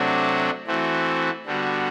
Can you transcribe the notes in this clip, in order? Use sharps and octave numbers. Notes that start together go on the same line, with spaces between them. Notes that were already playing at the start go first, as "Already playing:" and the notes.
Already playing: C3 F#3 A3 D4 F#4
E3 A3 C4 F#4
D3 G3 B3 F#4